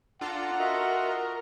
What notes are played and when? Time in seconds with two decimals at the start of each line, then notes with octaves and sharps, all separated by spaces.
0.21 D4 F4 A4 F#5 A#5
0.60 F#4 A#4 D#5 E5